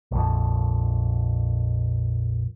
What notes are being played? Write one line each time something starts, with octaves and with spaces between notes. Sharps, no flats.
A#1 F2